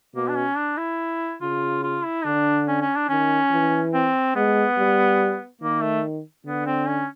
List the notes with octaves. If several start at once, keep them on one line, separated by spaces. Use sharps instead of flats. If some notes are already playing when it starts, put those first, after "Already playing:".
B2 A#3
D4
C#4
D4
E4
C#3 F4
F4
E4
D3 D4
C#4
C#4
D4
D#3 C#4
E3
C4
G#3 B3
G3
D#3 A#3
A3
D3 B3
C4
C#4